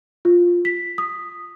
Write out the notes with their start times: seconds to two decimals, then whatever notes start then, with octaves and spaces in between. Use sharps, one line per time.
0.25 F4
0.65 B6
0.98 D#6